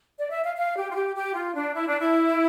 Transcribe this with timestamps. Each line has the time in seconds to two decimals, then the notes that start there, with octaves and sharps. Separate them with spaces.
0.17 D5
0.30 E5
0.43 F5
0.56 F5
0.76 G4
0.89 F4
0.95 G4
1.15 G4
1.34 F4
1.55 D4
1.74 E4
1.87 D4
2.00 E4